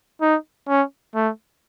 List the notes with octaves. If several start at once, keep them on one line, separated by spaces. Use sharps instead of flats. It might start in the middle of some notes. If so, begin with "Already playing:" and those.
D#4
C#4
A3